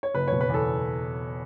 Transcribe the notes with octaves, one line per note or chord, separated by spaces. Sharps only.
C#5
F#1 B4
B2 C#5
B4
E2 A4